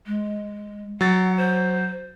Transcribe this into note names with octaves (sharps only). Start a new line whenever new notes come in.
G#3
F#3 F#5 A6
C5